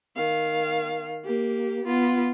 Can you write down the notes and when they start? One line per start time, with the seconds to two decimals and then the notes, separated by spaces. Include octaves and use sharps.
0.16 D#3 F5
1.25 A#3 G4
1.85 B3 F4